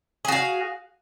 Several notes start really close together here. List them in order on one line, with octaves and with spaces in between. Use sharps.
G#4 F#4 F5